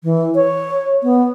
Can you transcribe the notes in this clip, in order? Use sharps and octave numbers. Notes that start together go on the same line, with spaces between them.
E3
C#5
B3